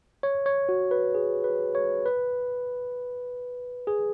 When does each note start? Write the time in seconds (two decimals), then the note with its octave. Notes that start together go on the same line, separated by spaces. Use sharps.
0.23 C#5
0.46 C#5
0.69 F#4
0.91 B4
1.15 G#4
1.44 B4
1.75 C#5
2.06 B4
3.87 G#4